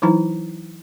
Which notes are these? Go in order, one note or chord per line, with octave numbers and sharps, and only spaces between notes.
E3 F#3 D#4 E4 A#5